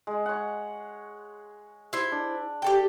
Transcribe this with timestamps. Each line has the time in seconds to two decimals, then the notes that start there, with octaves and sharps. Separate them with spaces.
0.07 G#3
0.26 C#5 F#5
1.93 E4 C5
2.12 D4
2.62 G4 A4 G5